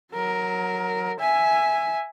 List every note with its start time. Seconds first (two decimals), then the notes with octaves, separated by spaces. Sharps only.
0.12 F#3 A#4
1.20 E5 G#5